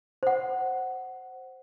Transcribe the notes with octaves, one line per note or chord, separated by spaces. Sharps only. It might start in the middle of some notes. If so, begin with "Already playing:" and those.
C5 F#5